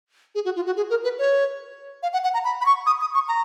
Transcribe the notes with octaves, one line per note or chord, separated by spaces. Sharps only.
G#4
F#4
F4
F#4
G#4
A#4
B4
C#5
F5
F#5
F#5
A#5
B5
B5
C#6
D#6
D#6
C#6
A#5